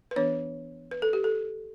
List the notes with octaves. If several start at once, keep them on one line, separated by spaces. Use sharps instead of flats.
B4
E3 B3 D4 C#5
B4
A4
G4
A4